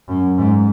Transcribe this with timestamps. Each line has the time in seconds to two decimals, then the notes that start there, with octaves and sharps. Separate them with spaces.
0.08 F#2
0.38 G#2